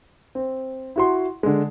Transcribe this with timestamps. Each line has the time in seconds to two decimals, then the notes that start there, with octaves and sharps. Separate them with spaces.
0.35 C4
0.96 E4 F#4 C6
1.43 D3 G#3